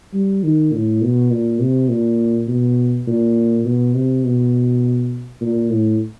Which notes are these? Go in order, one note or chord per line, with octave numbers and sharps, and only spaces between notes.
G3
D#3
A2
B2
A#2
C3
A#2
B2
A#2
B2
C3
B2
A#2
A2